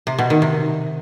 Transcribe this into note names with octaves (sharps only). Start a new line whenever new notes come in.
C3
B2
D#3
C3